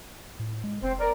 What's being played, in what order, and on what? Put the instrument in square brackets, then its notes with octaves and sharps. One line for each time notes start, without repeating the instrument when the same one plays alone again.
[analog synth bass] A2
G#3
[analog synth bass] F1 [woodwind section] C4 C5
[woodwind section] A#4 D5